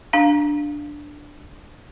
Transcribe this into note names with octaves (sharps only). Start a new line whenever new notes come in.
D4 F5